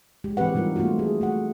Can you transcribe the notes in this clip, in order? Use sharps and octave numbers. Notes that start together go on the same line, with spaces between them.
G#3 G4
E3 C4 G4 B4 F#5
C3 G3 D#4 F4 A#4
A3 A#3 C4 F4 F#4
G#4
A3 F#4 F#5